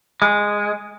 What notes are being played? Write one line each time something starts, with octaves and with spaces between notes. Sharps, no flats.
G#3